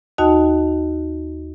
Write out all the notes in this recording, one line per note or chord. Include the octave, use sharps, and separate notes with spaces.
D#2 D#4 F#4 D#5 A5